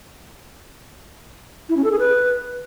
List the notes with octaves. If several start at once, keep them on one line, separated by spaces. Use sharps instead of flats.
E4
C#4
A4
G#4
B4